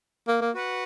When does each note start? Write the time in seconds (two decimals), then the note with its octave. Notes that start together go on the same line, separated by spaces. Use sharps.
0.28 A#3
0.41 A#3
0.54 F#4 B4 F#5